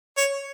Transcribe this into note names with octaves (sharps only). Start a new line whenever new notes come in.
C#5